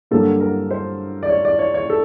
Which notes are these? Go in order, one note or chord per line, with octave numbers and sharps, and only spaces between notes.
G2 D3 F#3 A#3 A4
A#4
C5
D5
C#5
D5
C#5
C#5
A4